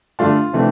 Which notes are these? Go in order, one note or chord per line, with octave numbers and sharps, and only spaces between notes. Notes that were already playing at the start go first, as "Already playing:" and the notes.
G2 D3 A3 D4 F4
C3 E3 A3 D4